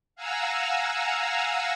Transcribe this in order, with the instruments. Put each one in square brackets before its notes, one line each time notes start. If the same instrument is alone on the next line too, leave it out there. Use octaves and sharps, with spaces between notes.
[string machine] F5 F#5 G#5 A#5 E6